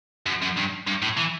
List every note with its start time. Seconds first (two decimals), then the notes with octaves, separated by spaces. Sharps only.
0.26 F#2
0.42 F#2
0.57 G2
0.87 G2
1.02 A2
1.17 E3